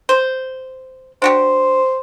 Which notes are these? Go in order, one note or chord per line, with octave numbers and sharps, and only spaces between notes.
C5
D4 F#4 G4 C5